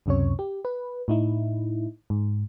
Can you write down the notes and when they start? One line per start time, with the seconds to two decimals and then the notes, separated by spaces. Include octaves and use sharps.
0.06 C#2 F#2 C3 C#4 C#5
0.39 G4
0.65 B4
1.08 A2 D#4 E4
2.10 G#2